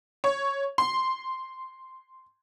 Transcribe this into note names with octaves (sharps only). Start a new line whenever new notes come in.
C#5
C6